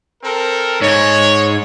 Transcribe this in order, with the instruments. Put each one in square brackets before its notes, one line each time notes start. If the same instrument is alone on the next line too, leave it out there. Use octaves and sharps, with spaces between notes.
[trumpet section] C4 A4 A#4
[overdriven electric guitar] G#2 [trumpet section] C#5